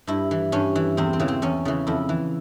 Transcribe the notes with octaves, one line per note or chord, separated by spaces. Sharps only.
G2 E4
E3
G2 C#4
E3
E2 C4
C4
C#3 E3
C4
E2 C#4
C#3 E3
F2 E4
E3